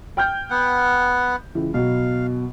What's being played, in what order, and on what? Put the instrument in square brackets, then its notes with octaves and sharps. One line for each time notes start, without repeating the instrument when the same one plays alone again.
[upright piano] G5 F6 G6
[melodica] B3 F#5
[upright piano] C#2 E3
[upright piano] B2 F#3 [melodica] F5